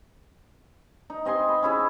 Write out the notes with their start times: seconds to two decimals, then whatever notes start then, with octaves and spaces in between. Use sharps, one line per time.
1.10 D#4
1.25 C4 D#5 G#5 C6
1.49 B5
1.63 C#4 E4 G#4